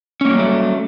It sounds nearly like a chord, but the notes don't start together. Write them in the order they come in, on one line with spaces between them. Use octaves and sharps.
C#4 A#3 F#3 G3 A3